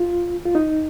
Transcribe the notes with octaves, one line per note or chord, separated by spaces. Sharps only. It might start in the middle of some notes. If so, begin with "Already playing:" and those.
Already playing: F4
F4
D#4